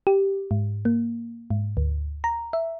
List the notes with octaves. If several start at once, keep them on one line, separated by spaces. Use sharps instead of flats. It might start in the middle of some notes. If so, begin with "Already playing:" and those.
G4
G#2
A#3
G#2
D2
A#5
E5